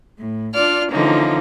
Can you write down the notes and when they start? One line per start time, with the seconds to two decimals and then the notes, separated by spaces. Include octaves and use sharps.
0.17 A2
0.53 D4 F4 D5 F6
0.91 D3 E3 F3 A#3 C#4 D#4